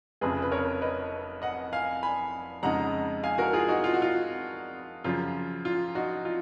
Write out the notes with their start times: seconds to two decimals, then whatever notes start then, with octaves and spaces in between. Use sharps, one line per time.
0.21 F1 F2 C#3 G#4 B4
0.42 B4
0.52 A#4 C#5
0.82 B4 D#5
1.42 D#5 F#5
1.73 F5 G#5
2.03 G#5 B5
2.63 F2 C#3 G#3 D#4 F#5 A#5
3.23 F5 G#5
3.38 F#4 A#4
3.53 F4 G#4
3.68 D#4 F#4
3.84 F4
3.94 F#4
4.02 F4
5.04 F#2 C#3 F3 F4
5.65 F4
5.95 D#4 F#4
6.25 F4